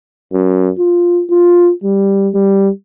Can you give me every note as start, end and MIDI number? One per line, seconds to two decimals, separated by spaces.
0.33 0.70 42
0.79 1.23 65
1.30 1.71 65
1.84 2.29 55
2.34 2.69 55